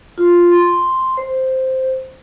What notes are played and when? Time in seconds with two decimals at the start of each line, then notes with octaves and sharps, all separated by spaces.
0.18 F4
0.52 C6
1.17 C5